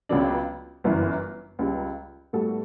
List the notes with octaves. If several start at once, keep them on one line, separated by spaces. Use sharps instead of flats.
C#2 C#3 F#3 B3 D4
G1 F#2 E3 B3 E4
C#2 C#3 G3
A2 G3 B3 F#4 A4